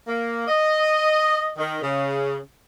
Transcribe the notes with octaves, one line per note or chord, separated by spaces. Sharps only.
A#3
D#5
D#3
C#3